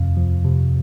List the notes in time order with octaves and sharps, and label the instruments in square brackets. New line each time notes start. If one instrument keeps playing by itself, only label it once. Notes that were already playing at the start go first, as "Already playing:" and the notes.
Already playing: [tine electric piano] F2 C3 F5
F3
C3